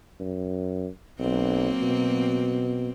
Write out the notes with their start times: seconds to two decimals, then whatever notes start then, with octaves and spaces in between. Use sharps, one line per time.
0.20 F#2
1.20 B1 F#3 A#3 C4
1.83 B2